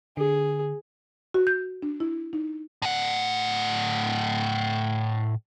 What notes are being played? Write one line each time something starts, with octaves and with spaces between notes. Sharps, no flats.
D3 G#4
F#4
G6
D4
E4
D#4
A2 F#5